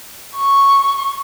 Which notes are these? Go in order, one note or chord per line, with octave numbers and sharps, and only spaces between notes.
C#6